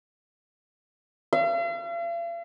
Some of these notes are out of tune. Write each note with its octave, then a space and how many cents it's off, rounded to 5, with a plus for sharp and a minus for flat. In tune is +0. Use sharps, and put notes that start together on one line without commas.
F5 -45